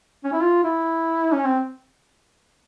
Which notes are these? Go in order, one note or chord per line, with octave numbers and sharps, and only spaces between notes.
C#4
E4
F4
E4
C#4
C4